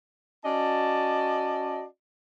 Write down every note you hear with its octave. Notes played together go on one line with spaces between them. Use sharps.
C#4 F#4 D5 D#5 A5